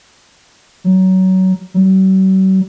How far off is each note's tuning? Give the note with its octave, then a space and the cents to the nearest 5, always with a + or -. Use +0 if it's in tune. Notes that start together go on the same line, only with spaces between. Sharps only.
F#3 +20
F#3 +45